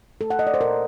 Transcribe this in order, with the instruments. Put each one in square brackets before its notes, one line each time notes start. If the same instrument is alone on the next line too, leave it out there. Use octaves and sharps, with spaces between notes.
[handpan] A3 A4
F#5
D#5
D5
C5
A#2 A#4